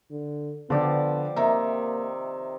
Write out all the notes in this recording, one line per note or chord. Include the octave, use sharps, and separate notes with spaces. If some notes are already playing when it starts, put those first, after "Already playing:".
D3
D3 F3 B3 D5 G5
C3 D#3 A#3 E5 A#5